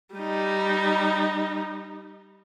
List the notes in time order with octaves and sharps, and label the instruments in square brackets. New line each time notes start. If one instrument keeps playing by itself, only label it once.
[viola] G3 D#4